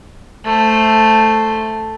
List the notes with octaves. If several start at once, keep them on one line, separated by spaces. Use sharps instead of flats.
A3 C5